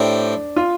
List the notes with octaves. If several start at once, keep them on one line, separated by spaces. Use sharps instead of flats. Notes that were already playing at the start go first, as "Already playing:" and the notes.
Already playing: A2 A3 C4 D4 G4
F4